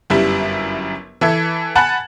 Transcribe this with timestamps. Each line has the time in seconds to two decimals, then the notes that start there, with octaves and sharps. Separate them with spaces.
0.10 G1 F#2 G3 E4
1.21 E3 A4 E5 G#6
1.75 F#5 G#5 A5 B5 F#6 A6